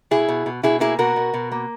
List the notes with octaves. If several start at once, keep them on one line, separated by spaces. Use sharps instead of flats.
B2 E4 G#4
B2
B2
B2 E4 G#4
A#3 E4 G#4
B2 F#4 A#4
B2
B2
A#3